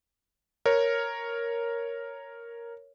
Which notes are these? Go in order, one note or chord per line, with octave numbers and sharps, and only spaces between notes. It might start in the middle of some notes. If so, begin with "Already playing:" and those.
A#4 C#5